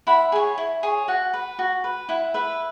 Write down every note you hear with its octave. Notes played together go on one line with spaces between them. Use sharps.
E4 F#5 B5
G#4 C#5
E4
G#4 C#5
F#4 F#5
B4
F#4
B4
E4 F#5
B4 E5